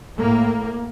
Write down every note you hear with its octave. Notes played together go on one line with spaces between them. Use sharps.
A2 A#3